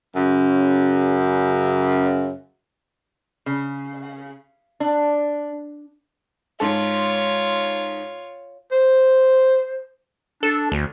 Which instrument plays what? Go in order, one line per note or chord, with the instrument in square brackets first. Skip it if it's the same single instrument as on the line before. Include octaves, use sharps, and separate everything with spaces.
[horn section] F#2 C#3
[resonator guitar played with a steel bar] C#3
D4
[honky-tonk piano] G#2 A4 [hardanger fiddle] F4 C#5
[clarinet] C5
[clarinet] D4 [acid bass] A4
[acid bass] D2